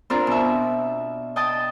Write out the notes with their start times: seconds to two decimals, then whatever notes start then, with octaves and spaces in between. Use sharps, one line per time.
0.10 C4 D4 F4 A#4
0.27 B2 E5
1.36 D#5 G5 A5 D#6